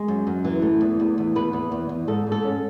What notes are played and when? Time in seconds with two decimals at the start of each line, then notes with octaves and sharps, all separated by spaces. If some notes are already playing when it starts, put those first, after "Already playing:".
Already playing: G#3
0.08 F#2
0.27 F#2
0.44 E3
0.62 A3
0.81 E2
1.00 E2
1.18 E2
1.35 E2 B4
1.53 E2
1.72 E2
1.89 E2
2.08 G#2 A4
2.27 G#2
2.32 A4
2.44 C#4